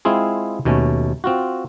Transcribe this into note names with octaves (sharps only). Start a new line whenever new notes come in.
G#3 C4 E4 F4 G#4
D#2 B2 A3 C#4
C4 F4 F#4